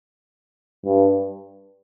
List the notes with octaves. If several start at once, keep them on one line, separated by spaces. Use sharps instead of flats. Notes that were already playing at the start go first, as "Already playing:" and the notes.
G2